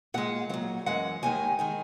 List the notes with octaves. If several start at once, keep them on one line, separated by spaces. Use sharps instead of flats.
A#2 G#3 F#5
A#2 F#3 F#5
F#2 E3 G#3 F#5
D#2 D#3 G#3 G#5
D#3 G#3 G#5